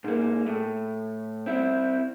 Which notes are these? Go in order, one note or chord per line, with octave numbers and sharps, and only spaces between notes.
G#2 A#3
A2
C4 E4